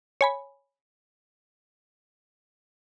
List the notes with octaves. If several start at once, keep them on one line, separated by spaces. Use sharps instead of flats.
C#5 G#5 B5